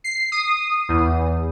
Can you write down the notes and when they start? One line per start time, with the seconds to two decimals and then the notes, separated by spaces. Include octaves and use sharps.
0.04 C7
0.32 D#6
0.89 E2